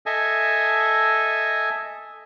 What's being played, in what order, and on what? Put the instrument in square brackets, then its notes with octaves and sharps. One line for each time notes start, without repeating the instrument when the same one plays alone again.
[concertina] A4 D#5 E5 G#5